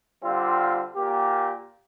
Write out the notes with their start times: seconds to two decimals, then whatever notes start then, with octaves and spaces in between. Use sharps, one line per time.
0.23 D3 G3 C4 F4
0.96 A#2 A#3 G4